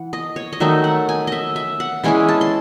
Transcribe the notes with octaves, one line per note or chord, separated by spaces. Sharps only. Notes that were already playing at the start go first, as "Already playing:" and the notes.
Already playing: E3 F#5
D#5
C#5
D#5
D#3 F#3 A3 D#4 E5
F#5
G#5
D#5 E5
E5
F#5
E3 G#3 C#4 E4 G#5
A5
C6